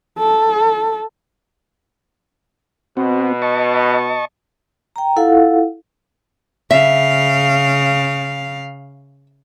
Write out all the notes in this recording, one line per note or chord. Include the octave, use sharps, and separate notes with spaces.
A4
B2 C4 F#4
D#5 A5 C#6
G5 A#5
E4 F4 A4 F5 F#5
C#3 E5 F5